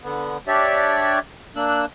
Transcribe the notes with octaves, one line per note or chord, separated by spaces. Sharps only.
D3 B3
D4 G4 C#5 D5 E5
A#3 D4 E6 F#6